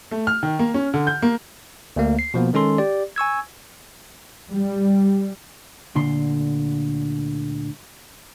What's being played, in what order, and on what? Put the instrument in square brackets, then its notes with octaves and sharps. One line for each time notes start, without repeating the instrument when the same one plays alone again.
[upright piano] A3
F6
D#3
A#3
C#4
D3
G6
A#3
[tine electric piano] D2 A3 A#3
C7
B2 F3 A#3 B3
D#3 G#3 C#4 A4 C6
G4 D5
G#5 C#6 E6 G#6
[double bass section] G3
[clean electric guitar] D2 A#2 D3 C6